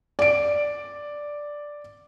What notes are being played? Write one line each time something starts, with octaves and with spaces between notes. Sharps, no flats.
D5 D7